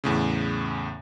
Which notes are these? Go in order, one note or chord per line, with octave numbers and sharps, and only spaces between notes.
E2 A2 C#3